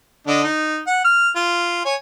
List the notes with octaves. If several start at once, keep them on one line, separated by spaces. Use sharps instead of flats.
D3 D4 D#5
D#4
F#5
F6
F4
C#5 G#5